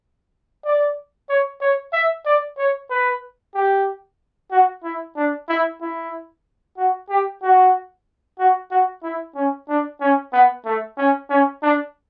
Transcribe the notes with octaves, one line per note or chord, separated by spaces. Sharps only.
D5
C#5
C#5
E5
D5
C#5
B4
G4
F#4
E4
D4
E4
E4
F#4
G4
F#4
F#4
F#4
E4
C#4
D4
C#4
B3
A3
C#4
C#4
D4